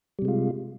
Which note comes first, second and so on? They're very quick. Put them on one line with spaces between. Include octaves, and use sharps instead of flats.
G3 C3 G#3 F4